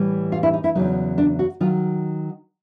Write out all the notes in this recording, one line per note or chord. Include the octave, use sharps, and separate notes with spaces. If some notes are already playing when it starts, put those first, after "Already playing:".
Already playing: A2 E3 G3
F4
E4
D#4
E4
E2 C#3 F#3 D#4
D4
F#4
D#3 F#3 F4